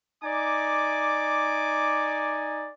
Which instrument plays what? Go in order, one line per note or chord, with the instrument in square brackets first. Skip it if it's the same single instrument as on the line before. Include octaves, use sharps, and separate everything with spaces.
[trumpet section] D#4 D5 G#5 [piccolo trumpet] D6